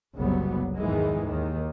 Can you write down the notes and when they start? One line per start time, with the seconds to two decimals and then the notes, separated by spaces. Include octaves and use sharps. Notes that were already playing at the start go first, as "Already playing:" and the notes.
0.16 F#1 C2 F#3 G3 B3
0.78 E2 G#2 D#3 E3 G#3
1.24 D#2 D#3